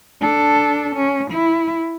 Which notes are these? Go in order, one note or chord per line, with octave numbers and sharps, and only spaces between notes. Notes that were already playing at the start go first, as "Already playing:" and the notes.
D4 A4
C#4
E4